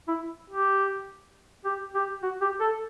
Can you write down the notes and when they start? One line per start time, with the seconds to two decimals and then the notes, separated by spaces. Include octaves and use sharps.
0.08 E4
0.50 G4
1.65 G4
1.95 G4
2.23 F#4
2.41 G4
2.60 A4